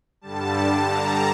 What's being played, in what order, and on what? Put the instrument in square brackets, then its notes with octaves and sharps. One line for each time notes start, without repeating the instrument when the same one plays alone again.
[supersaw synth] G2 D3 G3 A5
A#5